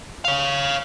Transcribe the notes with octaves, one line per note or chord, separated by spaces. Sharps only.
C#5 F5